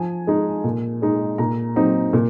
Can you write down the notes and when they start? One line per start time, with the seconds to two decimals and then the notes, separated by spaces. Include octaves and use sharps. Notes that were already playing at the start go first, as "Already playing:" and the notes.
Already playing: F3 G#5
0.27 G#3 D#4
0.64 A#2
1.02 G#3 D#4
1.38 A#2 A#5
1.76 F#3 C4 D#4
2.13 A#2